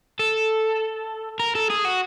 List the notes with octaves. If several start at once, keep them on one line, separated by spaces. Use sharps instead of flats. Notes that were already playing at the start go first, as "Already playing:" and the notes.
A4
A#4
A4
G#4
F#4